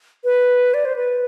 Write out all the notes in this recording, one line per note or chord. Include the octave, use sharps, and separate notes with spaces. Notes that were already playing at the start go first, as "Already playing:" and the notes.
B4
D5
C5
B4